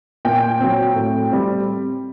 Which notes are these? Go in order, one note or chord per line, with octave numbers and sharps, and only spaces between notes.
A#2 G5
F#3 C4
A2
G3 C4